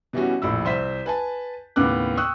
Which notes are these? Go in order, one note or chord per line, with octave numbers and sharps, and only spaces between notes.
B2 E3 G3 C#4 F#4
F1 A#1 A2 B5 E6
C2 C5 E5 B6
B4 G#5 A5
D#2 A2 C#3 B3 D6 F#6
G5 C#6 D#6 E6 F#6